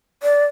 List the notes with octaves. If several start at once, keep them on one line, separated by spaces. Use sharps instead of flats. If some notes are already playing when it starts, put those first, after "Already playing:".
D5